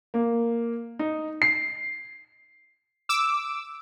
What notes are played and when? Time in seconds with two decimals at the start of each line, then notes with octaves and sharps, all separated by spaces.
0.14 A#3
0.99 D#4
1.42 C7
3.09 D6 E6